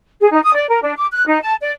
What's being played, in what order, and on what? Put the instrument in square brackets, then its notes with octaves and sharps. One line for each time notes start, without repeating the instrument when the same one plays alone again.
[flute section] G#4
D#4
D#6
D5
A#4
D4
D6
F#6
D#4
A5
D5